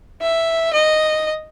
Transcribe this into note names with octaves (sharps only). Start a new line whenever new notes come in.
E5
D#5